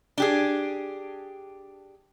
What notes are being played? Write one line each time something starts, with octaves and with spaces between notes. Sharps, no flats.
D4 G4 G#4